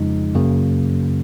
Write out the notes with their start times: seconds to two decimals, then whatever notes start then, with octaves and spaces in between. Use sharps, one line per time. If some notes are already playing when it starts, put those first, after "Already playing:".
Already playing: F2 C#3 F3 G#3 D#4
0.35 F#2 C#3 F#3 A#3